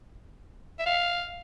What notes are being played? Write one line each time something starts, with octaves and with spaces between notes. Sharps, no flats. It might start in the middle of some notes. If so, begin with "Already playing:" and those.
E5
F5